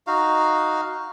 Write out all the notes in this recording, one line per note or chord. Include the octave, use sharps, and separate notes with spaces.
D#4 F#4 F5